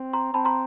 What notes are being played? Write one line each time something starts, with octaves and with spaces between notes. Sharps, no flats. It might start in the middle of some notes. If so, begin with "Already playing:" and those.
Already playing: C4
A#5 C6
C4 A5 B5
A#5 C6